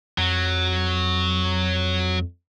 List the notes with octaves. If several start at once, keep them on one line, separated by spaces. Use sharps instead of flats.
F2 F#3